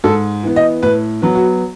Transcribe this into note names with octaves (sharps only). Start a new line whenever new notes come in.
G#2 A4
E3 B3
D#5
A2 B4
F#3 B3
F#4